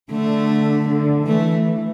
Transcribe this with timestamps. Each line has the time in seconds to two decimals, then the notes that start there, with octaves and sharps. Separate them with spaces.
0.11 D3 A3
0.89 D3
1.27 E3 A3